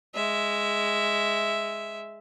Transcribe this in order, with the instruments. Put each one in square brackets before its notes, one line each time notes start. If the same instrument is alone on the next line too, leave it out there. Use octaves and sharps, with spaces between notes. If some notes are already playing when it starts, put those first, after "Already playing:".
[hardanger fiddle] G#3 E5